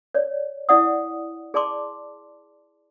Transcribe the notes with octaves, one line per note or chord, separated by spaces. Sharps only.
C#5 D5
E4 D5 F#5 D#6
G#4 D5 A5 C6 D6